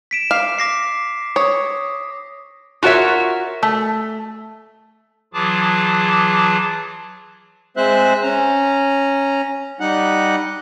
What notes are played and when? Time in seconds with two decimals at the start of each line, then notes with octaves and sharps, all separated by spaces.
0.11 B6 D7 E7
0.31 F5 D6
0.59 D6 A#6 C7
1.36 C#5 D#6
2.83 F4 F#4 A#4 C#5 E5
3.63 A3
5.34 E3 F#3 F4 G#4 A5 D6
7.77 G#3 C4 C5 E5 F#6
8.23 C#4 A#5
9.80 G3 D#4 F#5